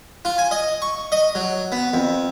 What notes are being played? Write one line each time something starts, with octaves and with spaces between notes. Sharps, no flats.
F4
G#5
D#5
C#6
D#5
F#3
B3
F2